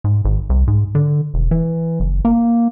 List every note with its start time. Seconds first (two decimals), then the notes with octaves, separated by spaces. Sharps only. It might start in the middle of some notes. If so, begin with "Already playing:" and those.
0.04 G#2
0.25 G#1
0.50 C2
0.67 G#2
0.95 D3
1.34 E1
1.51 E3
2.00 F#1
2.25 A#3